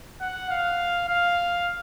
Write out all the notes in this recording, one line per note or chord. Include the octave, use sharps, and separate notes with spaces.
F#5
F5
F5